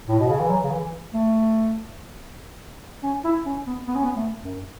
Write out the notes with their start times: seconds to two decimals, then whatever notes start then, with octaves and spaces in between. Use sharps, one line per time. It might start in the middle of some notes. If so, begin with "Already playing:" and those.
0.09 A2
0.19 B2
0.29 C#3
0.40 E3
0.50 F#3
0.63 C#3
0.71 E3
1.14 A3
3.03 C#4
3.24 E4
3.46 C#4
3.67 B3
3.88 B3
3.96 C#4
4.04 B3
4.16 A3
4.44 F#2